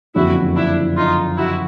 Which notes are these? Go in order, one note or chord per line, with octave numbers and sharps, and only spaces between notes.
F#1 F2 D3 E4 F#4
D4 E4
D#4 F4
E4 F#4